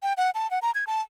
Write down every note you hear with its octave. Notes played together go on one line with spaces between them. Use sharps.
G5
F#5
A5
F#5
A#5
G#6
A5